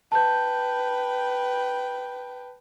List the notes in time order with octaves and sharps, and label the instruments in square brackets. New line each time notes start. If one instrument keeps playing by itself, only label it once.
[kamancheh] B4 G5 [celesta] A5 G6